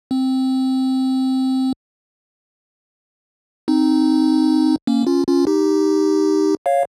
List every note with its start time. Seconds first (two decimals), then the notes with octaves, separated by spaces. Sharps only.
0.11 C4
3.68 C4 D#4
4.87 A#3 C#4
5.07 C#4 F4
5.27 C#4 F4
5.47 D#4 G4
6.66 C#5 F5